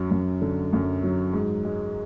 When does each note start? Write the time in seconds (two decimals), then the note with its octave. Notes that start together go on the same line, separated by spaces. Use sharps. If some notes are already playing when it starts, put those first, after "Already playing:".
Already playing: F#2 F#3
0.11 F#2
0.42 D3
0.73 F#2
1.03 F#3
1.33 G#2
1.65 G#3